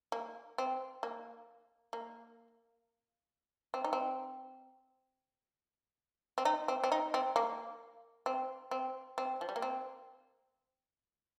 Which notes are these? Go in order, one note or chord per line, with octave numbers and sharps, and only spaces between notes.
A#3
C4
A#3
A#3
C4
D#4
C4
C4
D#4
C4
C4
D#4
C4
A#3
C4
C4
C4
F3
G3
A#3
C4